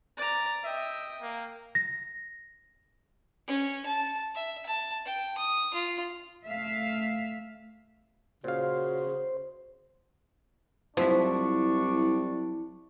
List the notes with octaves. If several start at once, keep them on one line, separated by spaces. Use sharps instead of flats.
D5 A#5
D#5 E5 G5
A#3
A#6
C#4
A5
E5
A5
G5
D#6
F4
A3 E5 F5
A#2 C#3 F#4 C5 F5
C2 F3 F#3 D4 E4 E5 C#6